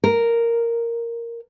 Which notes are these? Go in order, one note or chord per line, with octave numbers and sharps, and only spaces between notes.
A#4